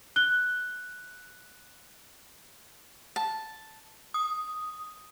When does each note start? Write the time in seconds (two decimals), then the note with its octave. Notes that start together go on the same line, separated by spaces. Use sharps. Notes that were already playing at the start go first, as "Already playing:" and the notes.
0.16 F#6 G7
3.16 A5
4.14 D#6